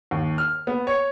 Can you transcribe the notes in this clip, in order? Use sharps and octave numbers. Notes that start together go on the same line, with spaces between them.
D#2
F6
B3
C#5